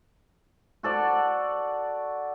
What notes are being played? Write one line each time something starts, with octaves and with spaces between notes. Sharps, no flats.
F#4 A4 D5 F#5